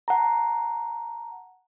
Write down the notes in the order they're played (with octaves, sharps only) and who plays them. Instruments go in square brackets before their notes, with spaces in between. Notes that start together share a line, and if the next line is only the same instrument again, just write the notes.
[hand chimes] F#5 A5 A#5